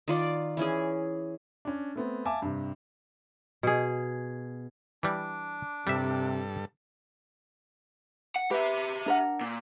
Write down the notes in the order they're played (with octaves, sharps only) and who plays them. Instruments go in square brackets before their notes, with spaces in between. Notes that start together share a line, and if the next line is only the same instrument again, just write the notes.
[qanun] D#3 F4 D5
E3 C#4 G#4
[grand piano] C#4 D4
A3 B3 C4
E5 F5 G#5 A5 D6
G2 C3
[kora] B2 G#4
[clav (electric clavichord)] E3 G3 [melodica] D4 D6
[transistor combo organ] G2 A4 [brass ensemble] C3 [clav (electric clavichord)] G3 E5
[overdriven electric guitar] F#5
[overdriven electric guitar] G4 E5 [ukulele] B4
[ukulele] D4 A#4 F#5
[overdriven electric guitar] A#2